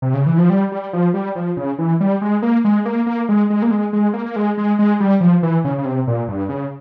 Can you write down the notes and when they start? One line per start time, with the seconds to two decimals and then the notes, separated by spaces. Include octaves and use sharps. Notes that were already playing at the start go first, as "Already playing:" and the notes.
0.02 C3
0.14 C#3
0.26 E3
0.38 F3
0.50 G3
0.72 G3
0.93 F3
1.14 G3
1.35 F3
1.57 C#3
1.79 E3
2.01 G3
2.21 G#3
2.42 A#3
2.65 G#3
2.85 A#3
3.06 A#3
3.29 G#3
3.50 G#3
3.62 A#3
3.71 G#3
3.93 G#3
4.13 A#3
4.26 A#3
4.36 G#3
4.57 G#3
4.79 G#3
5.00 G3
5.21 F3
5.43 E3
5.64 C#3
5.78 C#3
5.85 C3
6.07 A#2
6.28 G2
6.49 C#3